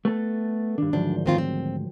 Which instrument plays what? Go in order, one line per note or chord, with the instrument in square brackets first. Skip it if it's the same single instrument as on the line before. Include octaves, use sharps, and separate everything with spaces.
[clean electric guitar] A3 B3 A4
[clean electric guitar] G2 D4 [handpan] D#3
[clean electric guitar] D2 G#2 C5 [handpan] F3 F#3 [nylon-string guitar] D4
[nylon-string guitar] D#3 C4 F4
C4